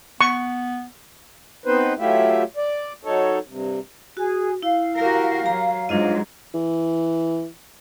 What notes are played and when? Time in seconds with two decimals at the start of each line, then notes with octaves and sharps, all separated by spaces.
0.21 B3 C#6
1.66 B3 C4 D#4 B4 C5
1.99 F#3 A3 E4 F4 G4 E5
2.57 D5
3.05 F#3 D#4 A4 C#5
3.48 G2 C3
4.17 F#4 G#4
4.62 E4 F5
4.97 F#4 G4 A#4
5.46 F#3 A#5
5.89 G#2 F#3 D4 F4 D#5
6.54 E3